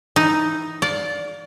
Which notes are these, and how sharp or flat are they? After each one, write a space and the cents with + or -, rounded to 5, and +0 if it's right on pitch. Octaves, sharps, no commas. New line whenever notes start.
E3 +0 D#4 +0
D5 -15 F5 +25